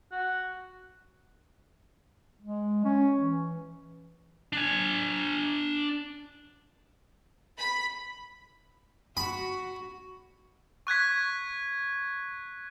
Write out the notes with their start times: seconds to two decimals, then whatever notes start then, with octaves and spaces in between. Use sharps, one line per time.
0.12 F#4
2.41 G#3
2.85 C#4
3.20 E3
4.53 D4 G#5
7.59 B5
9.17 F#4 B5
10.87 C#6 F#6 G#6 B6